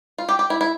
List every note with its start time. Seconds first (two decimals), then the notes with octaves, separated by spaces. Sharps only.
0.18 F4
0.29 G4
0.39 G4
0.50 E4
0.61 E4